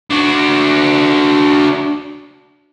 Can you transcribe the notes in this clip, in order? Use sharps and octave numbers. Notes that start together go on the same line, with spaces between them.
D4 F#4